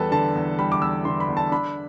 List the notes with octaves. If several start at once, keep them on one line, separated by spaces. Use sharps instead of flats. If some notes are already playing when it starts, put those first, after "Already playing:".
Already playing: E2 G3 A4 B4 A5
D3 A5
E2
G3 B5
D6
E2 E6
D3 C6
B5
E2
A5
D4 B5